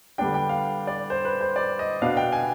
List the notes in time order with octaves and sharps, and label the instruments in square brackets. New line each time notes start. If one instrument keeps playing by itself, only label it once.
[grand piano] D3 G3 B3 D4 G5
G5
F5
D5
C5
B4
C5
D5
D#5
B2 B3 D4 F5
G5
G#5